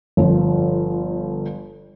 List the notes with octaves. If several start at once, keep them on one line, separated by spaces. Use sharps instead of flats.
G1 F3